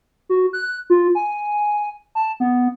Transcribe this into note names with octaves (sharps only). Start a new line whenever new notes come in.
F#4
F#6
F4
G#5
A5
B3